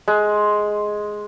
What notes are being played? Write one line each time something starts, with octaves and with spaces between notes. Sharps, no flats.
G#3